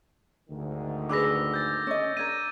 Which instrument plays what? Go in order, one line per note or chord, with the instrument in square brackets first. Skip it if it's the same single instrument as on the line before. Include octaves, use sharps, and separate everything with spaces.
[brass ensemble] D2 G#2 D#3
[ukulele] D4 G#4 B4 [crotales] D6 E6 A#6
[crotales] G6 A6
[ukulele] C#4 D#5
[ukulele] D4 A#4 [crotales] G#6 A#6 D#7